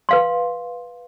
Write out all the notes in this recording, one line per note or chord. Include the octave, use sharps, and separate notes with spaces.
B4 F5 C6